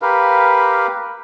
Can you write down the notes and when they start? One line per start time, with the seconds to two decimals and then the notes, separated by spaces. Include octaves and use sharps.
0.02 G4 A#4 B4 F5